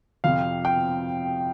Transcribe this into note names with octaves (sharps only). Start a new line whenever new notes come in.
F2 C3 F3 F5
G5